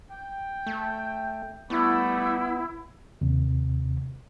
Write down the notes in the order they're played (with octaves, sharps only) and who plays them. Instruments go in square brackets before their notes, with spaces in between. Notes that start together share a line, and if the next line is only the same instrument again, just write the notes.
[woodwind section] G5
[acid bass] A3
[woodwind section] G3 A3 [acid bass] B3 [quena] E4
[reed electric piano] D#2 C3